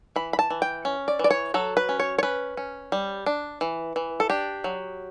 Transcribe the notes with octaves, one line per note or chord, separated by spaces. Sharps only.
E3 B5
B5
A5
E3
G5
C#4
D5
E3 D5
C#5
F#3 A4
B4
C#4
C#5
C#5
C#4 B4
C#4
G3
D4
E3
E3
A4
D4 G4
F#3